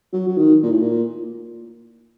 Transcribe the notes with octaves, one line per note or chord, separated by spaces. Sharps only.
F#3
F#3
D#3
A#2
A2
A#2